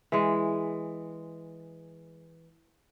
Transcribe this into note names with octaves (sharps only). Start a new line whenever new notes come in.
E3 G#3